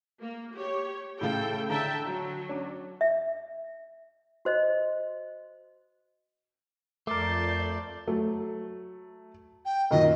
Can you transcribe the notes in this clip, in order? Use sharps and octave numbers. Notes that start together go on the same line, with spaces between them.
A#3
G4 C#5
A2 C#3 A4 F5 G5
D3 E5 G5 A5 A#5 D7
F#3
C#4 D4
E5
F#4 C5 D#5
F2 A3 A#4 D5 A5 C6 D6 G6
F#3 A3
G5
F#2 A#2 D#3 D#5